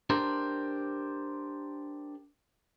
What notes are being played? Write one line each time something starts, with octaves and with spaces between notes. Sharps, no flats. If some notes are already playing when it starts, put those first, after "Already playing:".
D4 G4 A#4 C5